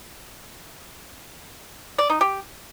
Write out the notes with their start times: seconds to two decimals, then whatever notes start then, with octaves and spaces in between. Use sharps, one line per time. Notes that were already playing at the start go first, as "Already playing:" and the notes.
1.98 D5
2.10 D#4
2.21 G4